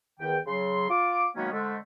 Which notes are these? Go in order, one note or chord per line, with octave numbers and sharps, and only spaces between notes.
E2 D#3 G5
C#3 F#3 C6
F4 D6
D#3 F#3 G#3 A#3 B3 C#4
D3 G#3 A3 C4